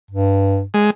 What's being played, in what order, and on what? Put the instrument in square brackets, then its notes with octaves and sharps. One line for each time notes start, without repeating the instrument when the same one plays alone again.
[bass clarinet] G2
[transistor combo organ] G#3